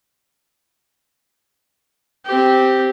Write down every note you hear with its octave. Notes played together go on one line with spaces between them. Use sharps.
C4 G4